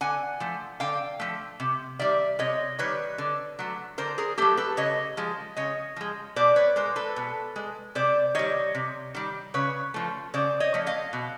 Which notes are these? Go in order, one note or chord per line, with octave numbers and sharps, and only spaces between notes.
D3 F#5 G#5
F3 A3
D3 F5 G5
F3 A3
C3
D#3 G3 D5 E5
C3 C#5 D#5
D#3 G3 B4 C#5
D3
F#3 A3
D3 A#4 C5
G#4 A#4
F#3 A3 G4 A4
A4 B4
C#3 C#5 D#5
F3 G#3
C#3 C#5 D#5
F3 G#3
B2 C5 D5
B4 C#5
G#3 A#4 C5
A4 B4
B2
G#3
C3 C5 D5
D#3 G3 C#5 D#5
C3
D#3 G3
C#3 B4 C#5
F3 A3
C#3 C5 D5
C#5 D#5
F3 A3
D#5 F5
B2